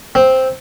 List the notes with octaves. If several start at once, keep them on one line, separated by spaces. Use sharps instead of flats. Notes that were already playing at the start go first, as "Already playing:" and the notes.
C4